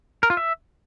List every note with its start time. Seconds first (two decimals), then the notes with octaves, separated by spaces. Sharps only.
0.23 A#4
0.30 F4
0.37 E5